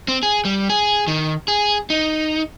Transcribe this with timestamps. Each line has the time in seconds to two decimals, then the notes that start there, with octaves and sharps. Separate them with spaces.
0.08 C4
0.23 G#4
0.45 G3
0.69 G#4
1.08 D#3
1.48 G#4
1.90 D#4